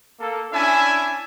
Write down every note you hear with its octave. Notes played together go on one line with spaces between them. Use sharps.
A#3 A4
C#4 D4 E4 E5 G#5